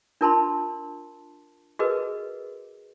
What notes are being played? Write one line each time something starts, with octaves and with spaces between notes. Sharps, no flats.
D4 F4 A#4 A5 B5 C6
F#4 G#4 A#4 B4 D#5